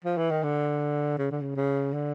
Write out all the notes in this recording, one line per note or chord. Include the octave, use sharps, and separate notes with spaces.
F3
E3
D#3
D3
C#3
D3
C#3
C#3
D3